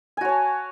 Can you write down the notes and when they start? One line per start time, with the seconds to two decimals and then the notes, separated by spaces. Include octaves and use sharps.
0.17 G#5
0.21 F#4
0.25 C#5
0.28 A5